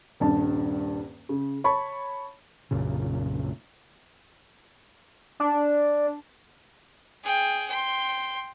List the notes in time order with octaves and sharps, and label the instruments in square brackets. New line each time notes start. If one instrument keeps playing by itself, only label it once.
[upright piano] D#1 G2 A5
C#3
C#5 A5 B5 C#6
[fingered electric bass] B1 F#2 A#2 C#3
[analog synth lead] D4
[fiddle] G#4 G5
G5 C6